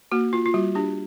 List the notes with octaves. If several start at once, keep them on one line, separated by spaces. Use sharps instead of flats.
A#3 F#4
F4
F4
G3 F#4
D4 G4